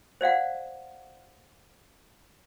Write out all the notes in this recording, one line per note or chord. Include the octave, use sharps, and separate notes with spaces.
C5 D5 F5 F#5